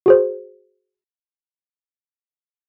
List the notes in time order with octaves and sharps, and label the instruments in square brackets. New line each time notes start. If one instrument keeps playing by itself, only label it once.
[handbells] F#4 G#4 C5